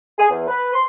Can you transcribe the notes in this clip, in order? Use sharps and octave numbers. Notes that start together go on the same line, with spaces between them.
G#4
E2
B4
C6